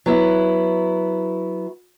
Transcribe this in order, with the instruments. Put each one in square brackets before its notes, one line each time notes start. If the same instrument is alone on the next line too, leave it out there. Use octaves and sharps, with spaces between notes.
[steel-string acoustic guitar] F#3 B3 E4